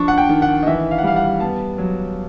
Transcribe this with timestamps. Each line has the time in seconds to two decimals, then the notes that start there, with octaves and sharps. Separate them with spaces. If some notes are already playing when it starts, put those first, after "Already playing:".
Already playing: F3 D4 C#6
0.08 F#5
0.18 G5
0.29 D#3
0.42 F#5
0.63 D#5
0.66 E3 E5
0.91 F5
0.98 F#5
1.03 G3 F5
1.16 F#5
1.40 B3 A5
1.78 F#3